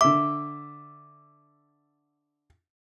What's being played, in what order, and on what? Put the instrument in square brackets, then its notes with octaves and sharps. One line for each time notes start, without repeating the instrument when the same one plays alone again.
[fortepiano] D3 E5 [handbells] D6